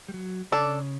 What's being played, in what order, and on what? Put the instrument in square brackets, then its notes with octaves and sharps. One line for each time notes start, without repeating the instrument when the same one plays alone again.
[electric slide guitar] G3
F#3
[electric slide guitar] C#3 [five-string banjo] D4 A4 D5